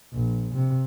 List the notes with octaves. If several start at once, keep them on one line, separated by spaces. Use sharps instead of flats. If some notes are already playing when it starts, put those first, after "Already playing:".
A#1
C3